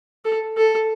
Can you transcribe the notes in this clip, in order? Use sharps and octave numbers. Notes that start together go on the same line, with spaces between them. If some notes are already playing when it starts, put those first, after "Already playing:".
A4
A4